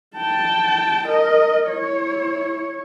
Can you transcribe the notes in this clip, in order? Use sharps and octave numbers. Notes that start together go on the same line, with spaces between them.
G5 A5
A#4 D#5
E4 C#5